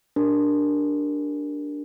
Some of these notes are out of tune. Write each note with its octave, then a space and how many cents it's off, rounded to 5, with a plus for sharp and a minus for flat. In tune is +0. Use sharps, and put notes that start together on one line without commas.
D4 +0 G4 +15 A#4 +0